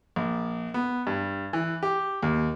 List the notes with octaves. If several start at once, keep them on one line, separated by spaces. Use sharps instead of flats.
A#1
B3
G2
E3
G4
D#2